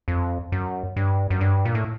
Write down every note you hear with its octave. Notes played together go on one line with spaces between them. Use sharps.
F2
F#2
G2
F#2
G2
A#2
A2